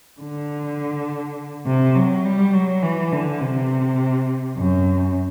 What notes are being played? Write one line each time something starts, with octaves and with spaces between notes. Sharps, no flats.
D3
C3
F#3
G3
F#3
E3
D3
C3
F#2